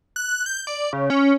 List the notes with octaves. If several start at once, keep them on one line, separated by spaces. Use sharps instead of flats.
F#6
G6
D5
C#3
C#4